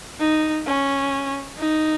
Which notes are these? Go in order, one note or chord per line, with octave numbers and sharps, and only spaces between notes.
D#4
C#4
D#4